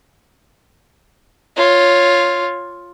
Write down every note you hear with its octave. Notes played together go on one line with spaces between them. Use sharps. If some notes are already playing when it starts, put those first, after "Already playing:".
F4 C#5